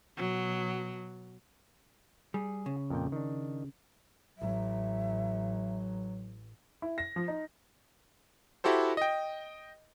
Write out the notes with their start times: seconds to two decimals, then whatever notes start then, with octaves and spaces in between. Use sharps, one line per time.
0.17 B2 F#3
2.34 G3 G#4
2.66 C#3
2.90 F2 A#2 G5
3.12 D#3 D4
4.38 A1 F#3 E5
6.82 E4
6.98 A#6
7.16 F3
7.28 D#4
8.64 E4 F#4 G4 A4 C5
8.97 D#5 G5